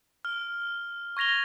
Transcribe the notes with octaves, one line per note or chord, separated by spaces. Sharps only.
F6 G7
C#6 G#6 A#6 F7 G7